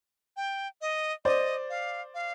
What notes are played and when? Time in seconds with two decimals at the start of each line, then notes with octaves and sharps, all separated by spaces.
0.37 G5
0.81 D#5
1.25 C5 D5 D#5
1.70 F5
2.14 F5